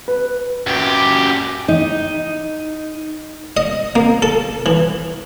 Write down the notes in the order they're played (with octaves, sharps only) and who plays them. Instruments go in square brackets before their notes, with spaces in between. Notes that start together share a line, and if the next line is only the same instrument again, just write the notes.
[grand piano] B4
[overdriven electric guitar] F#2 G4
[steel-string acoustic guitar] D#4
[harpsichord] D#5
A#3
A4
E3